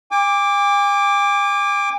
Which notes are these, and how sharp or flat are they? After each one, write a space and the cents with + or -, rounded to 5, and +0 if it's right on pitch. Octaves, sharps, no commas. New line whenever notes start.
G#5 -45 D6 +0